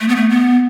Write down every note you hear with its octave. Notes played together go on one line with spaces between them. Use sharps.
A3
B3
A3
B3